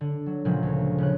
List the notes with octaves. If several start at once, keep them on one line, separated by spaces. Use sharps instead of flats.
D3
F#3
A#2 C#3 F3 F#3 G#3
D2
C#3 F4 F#6